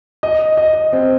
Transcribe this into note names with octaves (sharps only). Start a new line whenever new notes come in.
D#5
D#5
C4